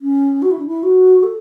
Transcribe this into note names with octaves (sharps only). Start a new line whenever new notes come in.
C#4
F#4
E4
D4
E4
F#4
A4